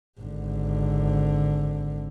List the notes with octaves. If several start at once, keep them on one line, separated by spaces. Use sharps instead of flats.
G#1 D3